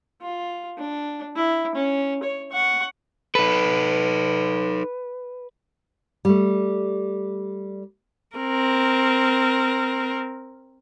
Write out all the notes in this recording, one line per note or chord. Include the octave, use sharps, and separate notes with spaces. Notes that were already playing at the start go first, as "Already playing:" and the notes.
F4
D4
E4
C#4
C#5
F#5 C#6
D#4 A4 B4
G3 A3
C4 A#4